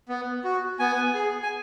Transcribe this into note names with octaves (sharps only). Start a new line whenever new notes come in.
B3
F#4
B3 G#5
G#4
G#5